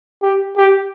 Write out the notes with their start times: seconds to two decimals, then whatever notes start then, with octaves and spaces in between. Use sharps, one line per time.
0.23 G4
0.57 G4